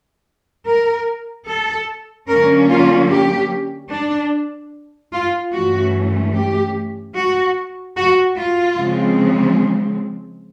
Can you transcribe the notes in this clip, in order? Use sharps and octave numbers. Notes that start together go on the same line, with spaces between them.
A#4
A4
D3 F#3 A#3 C#4 A#4
F4
G4
D4
F4
G2 E3 A3 C#4 F#4
G4
F#4
F#4
F4
C#3 F3 G#3 C4